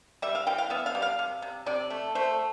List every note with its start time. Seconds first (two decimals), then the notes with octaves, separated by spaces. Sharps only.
0.22 G3 E5
0.35 F5
0.47 E3 G5
0.58 F5
0.70 B3 E5
0.86 F5
0.95 G3
1.02 F5
1.19 C3
1.42 C3
1.66 C3 D5
1.90 A3
2.15 A3 C5